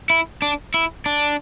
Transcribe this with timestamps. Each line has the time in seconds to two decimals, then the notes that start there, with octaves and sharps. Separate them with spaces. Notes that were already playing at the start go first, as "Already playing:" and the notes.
0.10 E4
0.42 D4
0.74 E4
1.06 D4